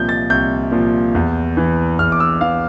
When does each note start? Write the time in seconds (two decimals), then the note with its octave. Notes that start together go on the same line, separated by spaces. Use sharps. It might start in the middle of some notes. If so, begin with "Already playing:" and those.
Already playing: C2 A#2 F3 G6
0.09 A6
0.30 C2 G6
0.72 A#2 F3
1.15 E2
1.57 E3
1.99 E2 F6
2.12 D6
2.20 E6
2.41 E3 F5